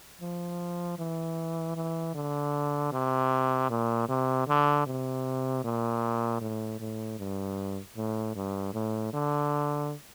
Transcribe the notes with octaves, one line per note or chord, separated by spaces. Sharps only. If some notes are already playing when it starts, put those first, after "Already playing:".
F3
E3
E3
D3
C3
A#2
C3
D3
C3
A#2
A2
A2
G2
A2
G2
A2
D3